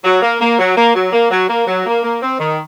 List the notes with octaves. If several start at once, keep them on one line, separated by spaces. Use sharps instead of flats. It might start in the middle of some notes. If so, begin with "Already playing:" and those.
F#3
A#3
A#3
F#3
A#3
F#3
A#3
F#3
A#3
F#3
A#3
A#3
C4
D#3